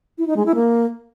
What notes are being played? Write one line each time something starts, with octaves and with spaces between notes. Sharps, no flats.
E4
D#4
G#3
E4
A#3